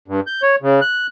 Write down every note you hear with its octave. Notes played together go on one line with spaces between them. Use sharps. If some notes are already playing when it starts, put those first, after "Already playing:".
G2
G6
C#5
C#3
F#6